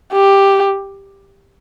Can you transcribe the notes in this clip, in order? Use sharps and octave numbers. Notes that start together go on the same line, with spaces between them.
G4